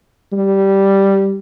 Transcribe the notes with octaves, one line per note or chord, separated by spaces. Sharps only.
G3